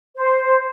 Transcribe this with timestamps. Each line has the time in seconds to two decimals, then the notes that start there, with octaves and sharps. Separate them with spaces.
0.16 C5